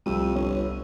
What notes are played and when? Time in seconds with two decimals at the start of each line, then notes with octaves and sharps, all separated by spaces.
0.06 C2 F2 G3 E6 D#7
0.36 G1 D4 C#5